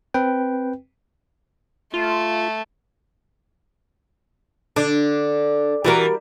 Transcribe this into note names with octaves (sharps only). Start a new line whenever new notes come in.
C4 B4 G5
A3 F4
D3 D4
E3 G3 F#4 A#4